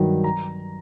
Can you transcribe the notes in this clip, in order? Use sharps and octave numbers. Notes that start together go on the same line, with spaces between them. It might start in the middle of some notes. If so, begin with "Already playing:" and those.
Already playing: G2 D#3 F#3
A#5